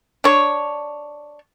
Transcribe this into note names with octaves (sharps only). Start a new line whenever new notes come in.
D4 C#5